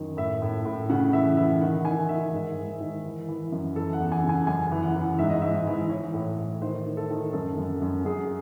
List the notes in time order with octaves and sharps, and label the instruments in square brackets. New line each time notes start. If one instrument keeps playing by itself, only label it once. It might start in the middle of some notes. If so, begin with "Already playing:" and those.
Already playing: [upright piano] F#2 D#3
A2 E5
A2
A2
C#3 F#5
E3 E5
E3 E5
D#3 F#5
D#3 G#5
D#3 E5
G#2
G#2
D#3
E3
E3
F#2
E3 A4
F#5
E2
G#5
C#3
G#5
F#2 G#5
E3
F#5
E3
G#2 E5
D#5
G#2 E5
E3
E3 C#5
A2
A2
D#3 C5
D#3
A4
D#3
F#2 A4
F#2
F#2
F#2 G#4